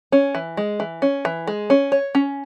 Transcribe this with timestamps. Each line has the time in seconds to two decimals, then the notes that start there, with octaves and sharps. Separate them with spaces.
0.12 C#4
0.35 E3
0.57 G#3
0.80 E3
1.02 C#4
1.25 E3
1.47 G#3
1.70 C#4
1.92 C#5
2.15 C#4